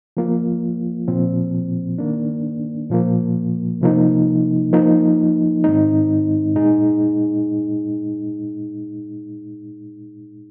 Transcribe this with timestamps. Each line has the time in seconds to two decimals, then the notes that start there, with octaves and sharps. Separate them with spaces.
0.17 F3 A#3 F4
1.08 A#2 F3 C4
1.98 D#3 A#3 D4
2.90 A#2 F3 A#3
3.81 C3 F3 A#3 D#4
4.73 F3 A#3 D#4
5.64 G#2 D#3 G#3 C4 D#4
6.55 A#2 G#3 D#4 G#4